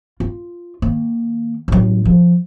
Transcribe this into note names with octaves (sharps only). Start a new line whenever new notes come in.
F4
D#3 A#3
A1 F#3
F3